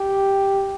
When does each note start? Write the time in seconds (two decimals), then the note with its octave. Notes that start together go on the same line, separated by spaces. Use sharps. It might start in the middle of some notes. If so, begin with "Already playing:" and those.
Already playing: G4